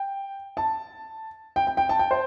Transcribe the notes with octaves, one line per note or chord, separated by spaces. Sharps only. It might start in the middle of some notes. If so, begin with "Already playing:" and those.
Already playing: G5
A5
G5
G5
G5
A5
G5
C5